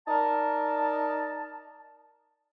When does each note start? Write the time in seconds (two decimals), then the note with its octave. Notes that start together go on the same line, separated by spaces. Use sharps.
0.08 D#4 A#4 D5 A5